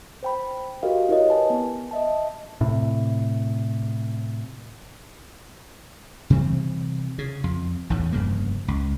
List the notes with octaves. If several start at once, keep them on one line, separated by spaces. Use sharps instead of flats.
C5 G5 B5
F#4 G4 A4 A#4 D#5 F5
E4 G4 A#4 C#5 D#5
B4 G#5 A5
B3
D#5 E5 A5
A2 C3
C3 E3 G3 C4
C#3
F2
A1 E2 G#2
F1 G2 C#3 A#3
C#2